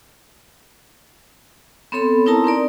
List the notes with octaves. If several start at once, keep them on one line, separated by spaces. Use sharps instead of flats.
B3 C4 A4 C#5 B5 C6
C4 D#4 E4 A#4 A5 A#5
C4 D#4 A#4 D5